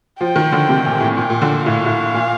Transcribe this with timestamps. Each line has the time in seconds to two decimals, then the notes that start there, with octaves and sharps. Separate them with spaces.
0.21 F3 G5
0.36 D#3
0.52 D3
0.69 C3
0.85 A#2
1.00 A2
1.17 A#2 G5
1.30 A#2
1.42 D3
1.66 A2 F5
1.86 A2
2.14 A#2